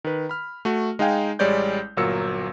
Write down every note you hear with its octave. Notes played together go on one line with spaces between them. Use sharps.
D#3 B4
B5 F6
A3 F#4
G#3 D#4 G#4 F5 G5 G#5
A1 G3 G#3 C#5 D5 G6
G1 A#2 F#3 A#4 E6 C#7